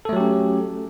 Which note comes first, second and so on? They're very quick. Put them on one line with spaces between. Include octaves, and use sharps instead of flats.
A4 A3 F#3 G4 C#4